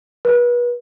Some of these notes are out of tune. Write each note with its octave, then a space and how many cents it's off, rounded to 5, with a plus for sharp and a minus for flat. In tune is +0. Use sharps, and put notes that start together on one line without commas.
B4 -35